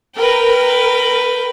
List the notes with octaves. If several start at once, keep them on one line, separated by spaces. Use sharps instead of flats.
A#4 B4 G5